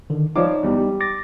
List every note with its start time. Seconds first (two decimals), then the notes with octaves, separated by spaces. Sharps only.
0.10 D3 D#3
0.36 F3 D#4 C#5 D5 D6
0.63 E2 G3
0.77 G3
1.00 D6 A6 A#6